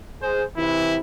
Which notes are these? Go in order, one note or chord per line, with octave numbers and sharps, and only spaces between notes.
G#4 C5
C3 E3 E4